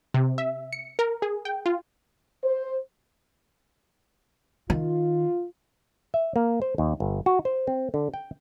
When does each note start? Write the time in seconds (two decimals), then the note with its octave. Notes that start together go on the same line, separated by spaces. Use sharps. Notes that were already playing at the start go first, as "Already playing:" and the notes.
0.14 C3
0.38 E5
0.73 C#7
0.99 A#4
1.22 G#4
1.45 G5
1.66 F4
2.44 C5
4.70 D#3 F4
6.14 E5
6.36 A#3
6.62 C5
6.78 D#2
7.00 G1
7.26 F#4
7.45 C5
7.67 C4
7.94 D3
8.14 G5